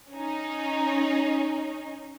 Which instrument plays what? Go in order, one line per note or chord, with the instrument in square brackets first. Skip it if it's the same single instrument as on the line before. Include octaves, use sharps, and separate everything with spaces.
[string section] C#4 D#4